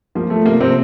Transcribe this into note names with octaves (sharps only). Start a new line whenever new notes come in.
F3 A#3
A3
C3 A#3
C3 C4